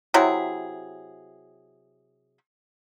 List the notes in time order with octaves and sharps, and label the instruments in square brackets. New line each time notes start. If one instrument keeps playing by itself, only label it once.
[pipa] C3 F#3 E4 G#4